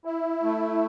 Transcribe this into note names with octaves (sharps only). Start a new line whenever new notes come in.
E4
A3